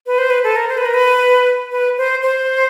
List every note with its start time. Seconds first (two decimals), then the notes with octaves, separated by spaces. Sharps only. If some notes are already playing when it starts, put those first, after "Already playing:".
0.07 B4
0.18 C5
0.30 B4
0.44 A4
0.56 A#4
0.69 C5
0.78 B4
0.86 A#4
0.94 B4
1.72 B4
1.98 C5
2.22 C5